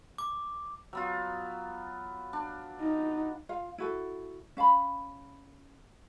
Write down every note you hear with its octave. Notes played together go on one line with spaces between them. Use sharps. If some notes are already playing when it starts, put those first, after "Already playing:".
D6
F#3 B3 F4
D4
D#4
F4 F5
E4 F#4 A4
C#4 F5 A5 B5